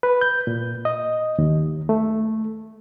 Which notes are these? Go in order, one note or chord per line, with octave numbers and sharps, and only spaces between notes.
B4
G6
A#2
D#5
D#2
A3